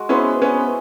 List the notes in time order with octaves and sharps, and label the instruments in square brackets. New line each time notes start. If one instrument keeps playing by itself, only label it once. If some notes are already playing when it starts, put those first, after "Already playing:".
Already playing: [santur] G#3 F#4
[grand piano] B3 C#4 [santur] E4 G#4 C5
[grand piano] B3 C#4